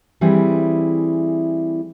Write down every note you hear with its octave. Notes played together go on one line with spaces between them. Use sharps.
E3 G3 C4 E4 G#4